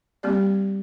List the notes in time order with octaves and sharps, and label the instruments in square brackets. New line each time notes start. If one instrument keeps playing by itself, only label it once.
[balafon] G3 A#3 C4 G4 D5